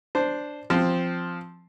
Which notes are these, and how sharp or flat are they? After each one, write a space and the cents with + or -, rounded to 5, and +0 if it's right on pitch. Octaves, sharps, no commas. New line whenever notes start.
D4 +0 C5 -5 A5 +0
F3 +0 C4 +0